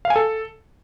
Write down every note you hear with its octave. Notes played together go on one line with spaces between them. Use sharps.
F5
G#5
A4